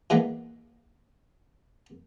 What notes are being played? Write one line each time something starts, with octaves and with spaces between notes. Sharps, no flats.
E3 G#3 A#3 B3